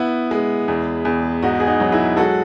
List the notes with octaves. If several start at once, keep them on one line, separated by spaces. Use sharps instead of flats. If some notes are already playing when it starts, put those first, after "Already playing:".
Already playing: B3 E4
G#3
E2
E2
G#2 D#4 F#4
G#4
D#4 F#4
F#3
E4 G#4
G#3 F#4 A4